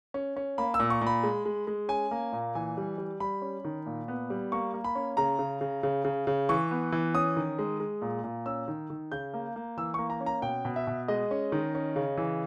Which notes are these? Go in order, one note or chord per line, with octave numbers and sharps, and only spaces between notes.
C#4
C#4
A#3 B5
E6
A#2
C#6
A#2
B5
G#3
G#3
G#3
C#4 G#5
A#3
A#2
E3 G#5
G3
G3
G3 B5
C#4
D#3
A#2
B3
G3
A#3 C#6
A#3
B5
C#4
C#3 A#5
C#3
C#3
C#3
C#3
C#3
E3 C#6
B3
E3
C#4 D#6
D#3
G#3
G#3
A#2
A#2
C#4 E6
D#3
D#3
C#3 G6
A#3
A#3
E3 E6
A#3 C#6
A#5
C#4
A#5
B2 G5
B2
E5
B2
G#3 D#5
C#4
D#3
C#4
C#3
E3